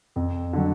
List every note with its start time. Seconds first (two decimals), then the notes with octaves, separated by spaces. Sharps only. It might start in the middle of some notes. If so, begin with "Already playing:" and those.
0.16 F2
0.53 D3 F#3